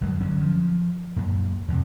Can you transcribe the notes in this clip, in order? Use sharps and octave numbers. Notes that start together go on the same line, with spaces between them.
G1 F#2 F#3 G#3
D3 F#3 C#4
F3
F#2 A#2
E2 C3